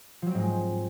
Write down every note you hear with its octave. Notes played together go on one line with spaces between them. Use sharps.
G#2 F3 F#3 G#3 C4